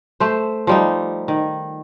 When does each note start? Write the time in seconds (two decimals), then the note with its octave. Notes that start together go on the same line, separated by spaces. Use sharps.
0.20 A3 C5
0.67 F3 G3 D#4
1.28 D#3